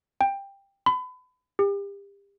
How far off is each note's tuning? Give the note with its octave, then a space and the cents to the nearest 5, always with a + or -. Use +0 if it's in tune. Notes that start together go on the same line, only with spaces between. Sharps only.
G5 +15
B5 +30
G4 +35